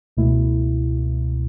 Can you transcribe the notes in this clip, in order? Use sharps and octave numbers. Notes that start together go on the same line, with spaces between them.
C#2 B2 A3 E4